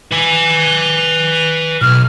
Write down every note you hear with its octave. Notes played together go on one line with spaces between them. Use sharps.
B4 G#5
B1 F6